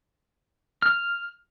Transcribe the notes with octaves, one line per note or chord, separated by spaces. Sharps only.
F6